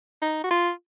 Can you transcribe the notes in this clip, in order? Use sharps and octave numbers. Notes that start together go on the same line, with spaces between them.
D#4
F#4
F4